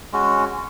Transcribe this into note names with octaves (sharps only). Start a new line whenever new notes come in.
G#3 C#4 F#4